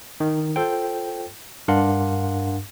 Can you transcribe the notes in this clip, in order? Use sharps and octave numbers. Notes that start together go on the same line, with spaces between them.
D#3
F4 A4 C5 G5
G2 D4 A#4 F5 F#5 C6